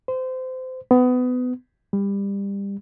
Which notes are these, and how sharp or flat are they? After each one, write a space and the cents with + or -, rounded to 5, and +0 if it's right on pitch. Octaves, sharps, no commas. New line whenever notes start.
C5 -25
B3 +25
G3 +25